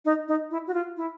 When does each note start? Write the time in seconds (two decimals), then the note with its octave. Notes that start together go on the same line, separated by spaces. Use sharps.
0.05 D#4
0.28 D#4
0.51 E4
0.67 F#4
0.74 F4
0.97 E4